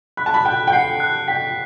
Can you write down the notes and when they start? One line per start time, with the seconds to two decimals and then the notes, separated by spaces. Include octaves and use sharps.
0.17 B5 F#6
0.26 A5
0.34 B5
0.45 G5 F#6
0.67 G5
0.72 F#5 C7
1.00 F#6
1.28 G5 B6